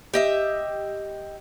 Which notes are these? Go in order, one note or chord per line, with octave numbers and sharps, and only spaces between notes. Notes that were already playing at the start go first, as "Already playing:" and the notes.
G4 D#5 E5